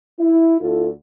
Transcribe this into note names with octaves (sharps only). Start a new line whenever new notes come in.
E4
D2 E4 F4 A4